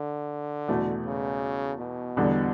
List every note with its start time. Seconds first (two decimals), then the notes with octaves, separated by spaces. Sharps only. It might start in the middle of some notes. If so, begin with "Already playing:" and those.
Already playing: D3
0.68 E2 B2 A3
1.06 C#3
1.80 B2
2.17 E2 D3 G3